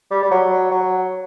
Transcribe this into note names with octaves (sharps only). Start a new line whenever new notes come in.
G3
G3
F#3
F#3